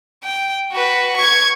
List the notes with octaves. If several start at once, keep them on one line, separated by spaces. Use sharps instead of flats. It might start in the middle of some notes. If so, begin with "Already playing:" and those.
G5
F#4 B4
C#6 G#6